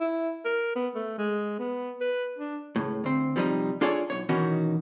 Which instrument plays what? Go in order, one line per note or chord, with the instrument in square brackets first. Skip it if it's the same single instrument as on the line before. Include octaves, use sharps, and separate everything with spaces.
[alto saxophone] E4
A#4
B3
A3
G#3
B3
B4
D4
[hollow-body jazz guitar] C#2 A2
D2 C4
C3 F3 G3 C4 D#4
D4 F4 G#4 A4 C#5 D5
B1 C#5
B2 D#3 E3 C#4 D#4 F#4